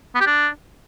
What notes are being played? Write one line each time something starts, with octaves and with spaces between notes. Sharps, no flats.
B3
G4
D4